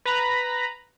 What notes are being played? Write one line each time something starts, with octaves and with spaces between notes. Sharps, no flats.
B4 A#5 B5